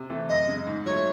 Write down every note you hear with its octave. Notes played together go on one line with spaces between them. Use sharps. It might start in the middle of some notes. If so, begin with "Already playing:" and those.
Already playing: C3
E3 A3 C4
F#2 D#5
C#3 G#3
G#2
F#3 A3 C#5